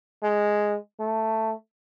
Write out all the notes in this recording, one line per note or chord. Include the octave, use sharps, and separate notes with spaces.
G#3
A3